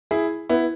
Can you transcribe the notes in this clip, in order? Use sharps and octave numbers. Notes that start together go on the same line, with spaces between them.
E4 G#4
B3 E4